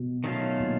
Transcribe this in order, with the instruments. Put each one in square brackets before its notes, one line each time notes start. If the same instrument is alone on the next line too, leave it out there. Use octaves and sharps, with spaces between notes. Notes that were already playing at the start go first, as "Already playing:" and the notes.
Already playing: [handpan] B2
[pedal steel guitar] D#3 F#3 A3 C#4 F4
[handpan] A#2